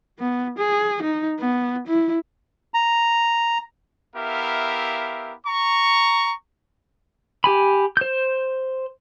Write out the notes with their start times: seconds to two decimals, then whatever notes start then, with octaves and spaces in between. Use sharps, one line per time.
0.19 B3
0.58 G#4
1.03 D#4
1.40 B3
1.87 E4
2.74 A#5
4.15 B3 E4 G4 A#4 E5 F5
5.47 A#5 C#6
7.44 G4 G#5 B5
7.97 C5 G6